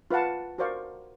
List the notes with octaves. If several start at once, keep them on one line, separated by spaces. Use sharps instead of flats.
F4 B4 F5 F#5 A5
F#4 A#4 C5 D5 F5 C#6